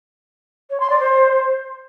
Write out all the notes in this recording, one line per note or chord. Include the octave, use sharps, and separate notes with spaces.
C#5
C6
D5
C5